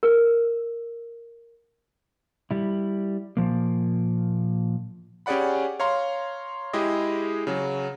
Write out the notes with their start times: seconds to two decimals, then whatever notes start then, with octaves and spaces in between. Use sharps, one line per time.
0.03 A#4
2.51 G3 E4
3.37 A#2 F3 A#3
5.26 C#4 G4 G#4 D5 F#5 B5
5.80 C#5 F5 A#5 C6
6.73 G#3 E4 G4 G#4 D#5
7.47 C#3 F#3